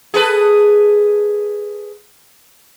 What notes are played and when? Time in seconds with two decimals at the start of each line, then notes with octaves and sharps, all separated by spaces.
0.14 G#4 A4 B4